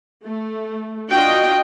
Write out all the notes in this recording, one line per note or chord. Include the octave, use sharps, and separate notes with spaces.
A3
D4 F4 F#4 D#5 G5